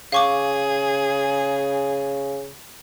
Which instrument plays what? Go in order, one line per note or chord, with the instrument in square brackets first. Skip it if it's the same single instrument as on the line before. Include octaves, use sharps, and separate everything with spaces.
[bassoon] C#3 [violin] G#4 [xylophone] F5 C#6 D6